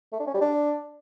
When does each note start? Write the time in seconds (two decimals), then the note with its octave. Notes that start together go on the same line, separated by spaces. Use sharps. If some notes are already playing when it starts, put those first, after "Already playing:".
0.13 A3
0.20 D4
0.27 C#4
0.34 G3
0.41 D4